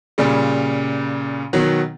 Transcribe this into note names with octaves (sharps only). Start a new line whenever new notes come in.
A#2 C#3 G3
B2 D#3 F#3